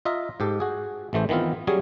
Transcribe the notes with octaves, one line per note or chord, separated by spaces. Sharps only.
F4 D#5 E5 A#5
G#2 G4 A4
F#4 G#4
A1 E3 A3 C5
D#3 E3 B3 C4 F4
F#3 G3 C#4 G#4 C#5